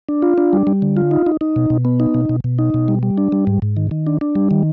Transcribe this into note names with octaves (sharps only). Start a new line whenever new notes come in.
D4
F4
D4
G3
G3
D3
F4
D#4
D#4
D#4
B2
B2
B3
D#4
B2
B2
B2
D#4
B2
G3
G3
D4
G3
G#2
G#2
D#3
D#3
D4
D4
G3
D#3